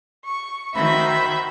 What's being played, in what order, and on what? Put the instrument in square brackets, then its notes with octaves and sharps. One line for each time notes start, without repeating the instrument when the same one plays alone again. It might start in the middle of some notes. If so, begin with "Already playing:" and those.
[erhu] C#6
[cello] D#3 F#4 [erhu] C5 [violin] E5 [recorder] B5